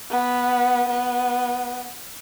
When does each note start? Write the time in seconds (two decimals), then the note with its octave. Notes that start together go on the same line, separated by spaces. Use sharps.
0.10 B3
0.89 B3